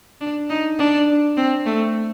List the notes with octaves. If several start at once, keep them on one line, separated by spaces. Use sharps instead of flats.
D4
D#4
D4
C4
A3